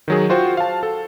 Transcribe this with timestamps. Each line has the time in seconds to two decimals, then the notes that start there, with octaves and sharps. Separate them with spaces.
0.08 D#3 F#3 G#4
0.30 F4 F#4 C5 G5
0.57 F5 A5
0.83 A4